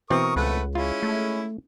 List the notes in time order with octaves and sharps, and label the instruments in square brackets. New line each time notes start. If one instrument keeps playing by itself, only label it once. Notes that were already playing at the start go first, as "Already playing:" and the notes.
[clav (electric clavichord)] B2 E3 C4 [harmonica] A#4 C#6 D#6
[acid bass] C#2 [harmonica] A3 B4 F#5
[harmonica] G#3 C#4 E4 [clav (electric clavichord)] F4
[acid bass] A3